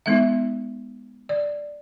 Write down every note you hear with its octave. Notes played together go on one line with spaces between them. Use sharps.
G#3 B3 D#4 E5
D5